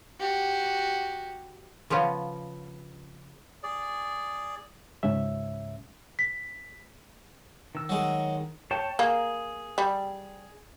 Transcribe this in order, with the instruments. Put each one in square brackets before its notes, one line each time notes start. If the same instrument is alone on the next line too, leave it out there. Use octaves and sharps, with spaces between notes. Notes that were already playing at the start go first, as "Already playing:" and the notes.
[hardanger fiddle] F#4 G4
[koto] C#3 F3 B3 C#4
[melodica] G#4 D5
[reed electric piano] C#2 G#2 C#4 E5
[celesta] B6
[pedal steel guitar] D#3 E6
[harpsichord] F#3 G#3
[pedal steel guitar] C#5 G5 A5
[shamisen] A#3 [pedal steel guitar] G#4
[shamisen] G3